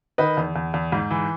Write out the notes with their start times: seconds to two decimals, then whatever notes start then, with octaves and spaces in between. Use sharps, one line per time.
0.18 D#3 B4 D#5
0.37 E2
0.56 E2
0.74 E2
0.92 G#2
1.10 E3